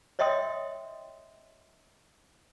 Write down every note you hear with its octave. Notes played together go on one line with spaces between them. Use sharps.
C#5 D#5 E5 G5 C6 D#6